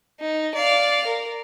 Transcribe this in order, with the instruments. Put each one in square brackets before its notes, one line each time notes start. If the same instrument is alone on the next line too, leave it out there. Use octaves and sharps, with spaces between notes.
[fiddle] D#4
D5 F5
A#4